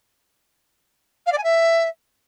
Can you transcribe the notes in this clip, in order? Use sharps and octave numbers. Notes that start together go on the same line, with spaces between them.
F5
D5
G#5
E5